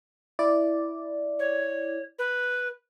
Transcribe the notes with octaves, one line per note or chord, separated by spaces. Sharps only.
E4 D5
C#5
B4